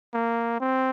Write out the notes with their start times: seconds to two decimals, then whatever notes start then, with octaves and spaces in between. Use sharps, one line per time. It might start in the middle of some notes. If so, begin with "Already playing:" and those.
0.14 A#3
0.61 C4